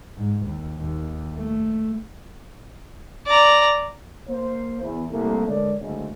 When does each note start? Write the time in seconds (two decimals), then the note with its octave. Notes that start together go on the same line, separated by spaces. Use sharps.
0.17 G#2
0.46 D#2
0.78 D#2
1.35 A3
3.26 D5 A#5
4.28 A#3 C5
4.81 E2
5.10 C2 A3 A#3
5.47 D3 G#3 A4 A#4 C#5 D5
5.80 F#1 D2 C#3 G#3